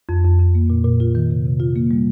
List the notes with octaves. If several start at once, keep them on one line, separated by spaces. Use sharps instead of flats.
F2
F2
F2
A#3
A#2
A#2
F4
D#3
C3
C3
F4
A#3
G3